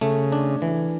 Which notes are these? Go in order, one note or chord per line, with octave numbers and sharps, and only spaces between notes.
C#3 A3
D4
E3